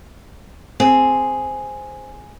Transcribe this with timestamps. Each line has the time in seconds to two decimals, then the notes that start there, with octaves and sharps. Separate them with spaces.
0.80 C4 G#4